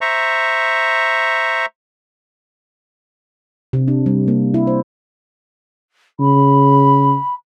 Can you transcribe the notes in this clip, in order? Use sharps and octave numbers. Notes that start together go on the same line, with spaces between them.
C5 E5 A#5 C#6
C3
D4
G3
A#3
E4
C5
C#3 B5